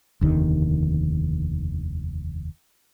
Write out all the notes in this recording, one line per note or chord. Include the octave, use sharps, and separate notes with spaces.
F1 D#2 D3 D#3